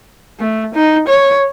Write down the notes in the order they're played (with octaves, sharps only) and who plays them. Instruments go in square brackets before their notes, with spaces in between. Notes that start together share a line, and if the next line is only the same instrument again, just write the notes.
[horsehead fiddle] A3
D#4
C#5